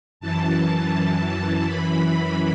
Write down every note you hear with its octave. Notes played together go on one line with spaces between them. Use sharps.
F#2 E3 A5
F#2 E3 B5